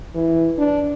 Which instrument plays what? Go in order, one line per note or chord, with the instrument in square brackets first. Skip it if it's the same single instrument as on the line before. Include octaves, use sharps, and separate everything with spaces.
[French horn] E3
D4